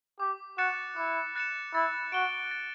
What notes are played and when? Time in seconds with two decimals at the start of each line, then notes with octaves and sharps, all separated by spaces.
0.20 G4 D6
0.58 F#4 F#6 A6 C#7 E7
0.96 E4 D6
1.36 F#6 A6 C#7 E7
1.74 E4 A6
2.12 F#4 D7 G7
2.51 A6